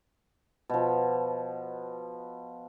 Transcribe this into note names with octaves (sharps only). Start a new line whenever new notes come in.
B2 F3